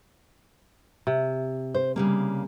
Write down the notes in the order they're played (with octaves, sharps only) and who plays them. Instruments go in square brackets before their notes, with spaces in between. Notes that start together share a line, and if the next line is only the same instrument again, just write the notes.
[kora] C3
[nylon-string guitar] C5
C#3 G3 A#3